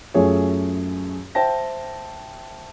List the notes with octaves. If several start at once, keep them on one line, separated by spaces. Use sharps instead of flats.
F#2 A3 F4 G#4 C#5
C5 E5 G5 A5 A#6